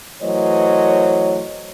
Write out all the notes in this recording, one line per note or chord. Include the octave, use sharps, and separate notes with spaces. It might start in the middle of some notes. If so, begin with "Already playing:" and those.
E3 F#3 A3 C5 C#5 D#5